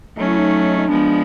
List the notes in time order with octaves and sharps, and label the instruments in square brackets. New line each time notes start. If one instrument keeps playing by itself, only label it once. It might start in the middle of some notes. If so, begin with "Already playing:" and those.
[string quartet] F#3 A3 C#4 [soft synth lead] D#4
[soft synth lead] E4
D#4
D#4
[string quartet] F3 G#3 B3 [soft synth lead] D4